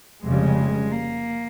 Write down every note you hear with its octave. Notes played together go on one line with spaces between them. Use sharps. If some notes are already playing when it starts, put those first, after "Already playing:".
F1 F2 C#3 G3 G#3
A#3